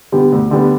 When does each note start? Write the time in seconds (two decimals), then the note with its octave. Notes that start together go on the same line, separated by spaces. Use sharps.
0.12 D3 G3 B3 G4
0.32 D2
0.51 D3 G3 B3